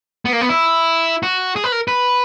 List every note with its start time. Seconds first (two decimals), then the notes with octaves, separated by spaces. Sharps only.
0.25 B3
0.33 A#3
0.41 B3
0.49 E4
1.23 F#4
1.56 G#4
1.64 B4
1.72 A#4
1.88 B4